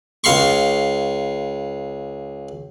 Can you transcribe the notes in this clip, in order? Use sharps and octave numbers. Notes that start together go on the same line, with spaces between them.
C#2 F5 C6 C#6